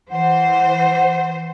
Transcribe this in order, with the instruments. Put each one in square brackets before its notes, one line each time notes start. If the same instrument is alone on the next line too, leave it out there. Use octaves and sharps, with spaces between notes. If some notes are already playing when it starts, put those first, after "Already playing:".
[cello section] E3 C5 [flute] F#5